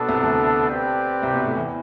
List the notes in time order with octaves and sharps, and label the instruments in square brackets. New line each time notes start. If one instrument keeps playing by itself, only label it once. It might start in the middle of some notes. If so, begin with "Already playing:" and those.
Already playing: [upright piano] B2 [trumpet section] B3 D4 A4
[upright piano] C2 C3
D2 D3
[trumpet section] C4 G4 B4 D5 G5
[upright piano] C2 C3
B2
A2
E2 E3